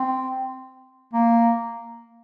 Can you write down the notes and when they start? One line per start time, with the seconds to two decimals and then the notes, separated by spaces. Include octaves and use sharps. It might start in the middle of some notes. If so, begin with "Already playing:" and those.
Already playing: C4
1.13 A#3